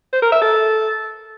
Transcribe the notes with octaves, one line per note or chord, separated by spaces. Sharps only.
C5
A#4
E5
A4